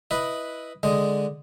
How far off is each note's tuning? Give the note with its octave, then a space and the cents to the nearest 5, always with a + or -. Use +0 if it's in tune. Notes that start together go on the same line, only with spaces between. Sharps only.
E4 +0 B4 +0 D#5 +0
D3 +0 G#3 +0 D#5 +0